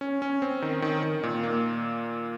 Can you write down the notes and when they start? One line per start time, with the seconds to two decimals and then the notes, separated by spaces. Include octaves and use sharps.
0.01 C#4
0.22 C#4
0.42 C4
0.62 D#3
0.82 D#3
1.03 D#3
1.23 A#2
1.43 A#3